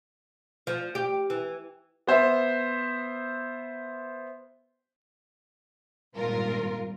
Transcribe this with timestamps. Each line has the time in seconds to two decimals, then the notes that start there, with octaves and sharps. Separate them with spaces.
0.67 F3
0.95 G4
1.30 E3
2.07 B3 C5 E5
6.15 G#1 G2 A#2 F4 A#4